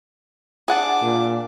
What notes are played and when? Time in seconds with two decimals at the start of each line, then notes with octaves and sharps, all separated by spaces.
0.68 D4 G#4 F#5 A5 D6
1.02 A#2